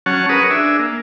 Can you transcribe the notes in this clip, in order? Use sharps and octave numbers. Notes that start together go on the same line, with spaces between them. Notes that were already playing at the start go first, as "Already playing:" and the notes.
F#3 C#4 C#5 F#5 A5
F#4 G#4 A#4 B4 C#6 D#6
D4 G#4 E5
A#3